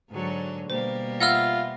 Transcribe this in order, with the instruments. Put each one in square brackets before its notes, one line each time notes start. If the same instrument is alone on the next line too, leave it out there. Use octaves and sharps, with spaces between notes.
[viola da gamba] G#2 D3 F#3
[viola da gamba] B2 G3 A#3 [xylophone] C5
[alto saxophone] F4 [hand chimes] E5 B5 A#6 [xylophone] F#5 E6 F6